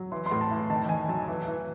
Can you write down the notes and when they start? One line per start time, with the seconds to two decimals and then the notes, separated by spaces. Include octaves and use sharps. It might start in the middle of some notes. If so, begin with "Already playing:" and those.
Already playing: F#3
0.12 E3 C6
0.26 C6
0.31 A2
0.41 A5
0.51 E3
0.70 D#3 A5
0.89 D#3 G#5
1.08 F#3 A5
1.28 E3
1.48 E3